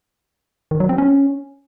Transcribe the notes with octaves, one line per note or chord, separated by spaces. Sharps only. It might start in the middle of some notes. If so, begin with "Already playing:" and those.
D#3
F#3
C4
C#4